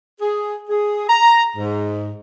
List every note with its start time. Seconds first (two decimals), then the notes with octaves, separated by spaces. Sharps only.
0.20 G#4
0.68 G#4
1.08 A#5
1.56 G#2